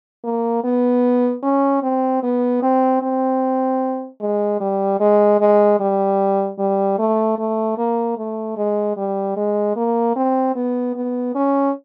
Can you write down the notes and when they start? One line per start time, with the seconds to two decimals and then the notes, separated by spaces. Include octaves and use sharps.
0.24 A#3
0.64 B3
1.43 C#4
1.82 C4
2.23 B3
2.62 C4
3.02 C4
4.21 G#3
4.60 G3
5.00 G#3
5.40 G#3
5.80 G3
6.59 G3
6.99 A3
7.39 A3
7.78 A#3
8.18 A3
8.57 G#3
8.97 G3
9.37 G#3
9.76 A#3
10.16 C4
10.55 B3
10.96 B3
11.35 C#4